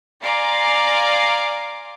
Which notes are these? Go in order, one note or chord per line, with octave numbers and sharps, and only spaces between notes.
D5 F5 G#5 A#5 C6 D6